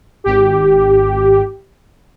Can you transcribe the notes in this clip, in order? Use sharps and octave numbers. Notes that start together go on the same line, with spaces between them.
G#1 G4